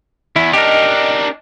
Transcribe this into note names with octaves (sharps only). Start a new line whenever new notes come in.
E2 E4
D4 D#4 G4 A#4 D#5